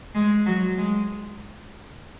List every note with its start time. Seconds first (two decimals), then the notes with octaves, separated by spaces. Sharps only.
0.15 G#3
0.46 F#3
0.77 G#3